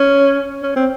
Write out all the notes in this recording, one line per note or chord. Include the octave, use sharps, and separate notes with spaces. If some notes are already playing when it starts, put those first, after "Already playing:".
Already playing: C#4
C#4
C4